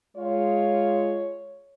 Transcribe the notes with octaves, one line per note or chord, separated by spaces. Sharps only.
G#3 F4 C#5